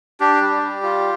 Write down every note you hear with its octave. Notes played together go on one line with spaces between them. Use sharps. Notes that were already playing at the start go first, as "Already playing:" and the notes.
D4 G4
G3
G3
F4